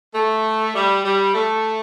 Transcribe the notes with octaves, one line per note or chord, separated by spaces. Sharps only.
A3
G3
G3
A3